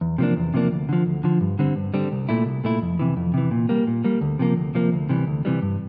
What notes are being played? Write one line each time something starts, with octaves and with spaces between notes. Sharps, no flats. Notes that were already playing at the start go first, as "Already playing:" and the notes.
E2
C3 F3 A#3 D4
E2
C3 F3 A#3 D4
D2
D3 F3
D2
D3 F3
G2
D3 G3 C4
G2
D3 G3 C4
C2
A#2 A3 E4
C2
A#2 A3 E4
F2
C3 E3
F2
C3 E3
A#2
G3 A#3
A#2
G3 A#3
D2
C3 F3 A#3
D2
C3 F3 A#3
D2
C3 E3 G3
D2
C3 E3 G3
G2